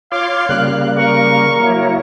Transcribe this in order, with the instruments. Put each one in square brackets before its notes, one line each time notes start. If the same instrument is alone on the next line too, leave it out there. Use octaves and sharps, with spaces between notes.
[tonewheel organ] F4 C#5 C6 [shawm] F5 [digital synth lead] D6
[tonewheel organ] C#3 G3 A#3 [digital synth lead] F#6
[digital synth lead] A#4 [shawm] C#6
[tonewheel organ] F#3 A#3 E4